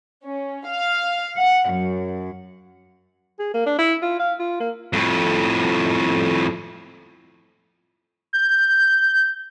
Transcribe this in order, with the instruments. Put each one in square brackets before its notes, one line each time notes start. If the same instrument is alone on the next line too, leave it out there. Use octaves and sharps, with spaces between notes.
[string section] C#4
F5
F#5
F#2
[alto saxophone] G#4
A#3
D4
E4
F4
F5
F4
A#3
[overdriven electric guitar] F2 A2
[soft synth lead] G6